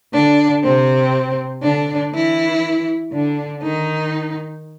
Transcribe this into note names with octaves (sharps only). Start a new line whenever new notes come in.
D3 D4
C3 C4
D3 D4
E3 E4
D3 D4
D#3 D#4